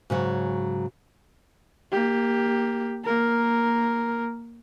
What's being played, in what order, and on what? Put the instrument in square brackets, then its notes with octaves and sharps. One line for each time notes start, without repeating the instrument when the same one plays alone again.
[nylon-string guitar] G#2 C#3 F#3
[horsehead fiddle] A#3 G4
A#3 A#4